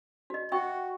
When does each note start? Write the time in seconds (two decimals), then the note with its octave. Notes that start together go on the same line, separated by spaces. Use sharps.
0.30 F#4 D#5
0.52 F#4 E5 G5 C#6